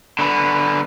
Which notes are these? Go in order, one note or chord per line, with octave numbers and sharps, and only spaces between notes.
D3 B3